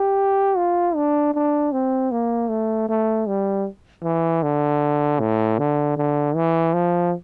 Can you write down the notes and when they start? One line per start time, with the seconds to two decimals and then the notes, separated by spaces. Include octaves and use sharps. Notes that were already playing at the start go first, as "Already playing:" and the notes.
Already playing: G4
0.57 F4
0.96 D4
1.34 D4
1.72 C4
2.11 A#3
2.50 A3
2.89 A3
3.27 G3
4.04 E3
4.43 D3
5.20 A2
5.58 D3
5.97 D3
6.35 E3
6.73 F3